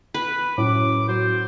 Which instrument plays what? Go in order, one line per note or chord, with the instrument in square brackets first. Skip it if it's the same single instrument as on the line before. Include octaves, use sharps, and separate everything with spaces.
[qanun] B4
[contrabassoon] F#2 [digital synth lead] A2 [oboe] D6
[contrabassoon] F#3 [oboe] C5